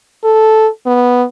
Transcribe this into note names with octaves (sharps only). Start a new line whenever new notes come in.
A4
B3